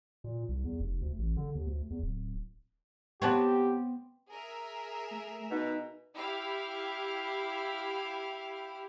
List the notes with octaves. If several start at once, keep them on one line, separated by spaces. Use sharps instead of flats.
A#2
C2
E2
F1
D2
A1
D3
D#2
D2
E2
D1
B3 C4 G4 C#5 F#5 A5
G#4 A#4 E5
A3
B2 D#4
E4 G4 F5